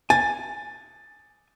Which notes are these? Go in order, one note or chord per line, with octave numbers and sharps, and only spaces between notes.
G#5 A6